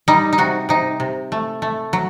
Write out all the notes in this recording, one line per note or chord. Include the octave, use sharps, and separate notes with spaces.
G3 D#4
D#4
C3 F#4
C3 D#4
C3
A3
A3
F#3